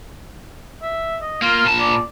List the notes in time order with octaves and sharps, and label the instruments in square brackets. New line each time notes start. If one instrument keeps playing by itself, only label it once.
[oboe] E5
D#5
[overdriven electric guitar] A#3 [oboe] F4
[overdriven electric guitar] A#2 A5
[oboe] D5